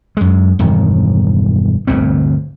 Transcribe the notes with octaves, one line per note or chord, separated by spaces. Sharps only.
F#2 G#3
E1 G2 D#3
G1 D2 A#2 C4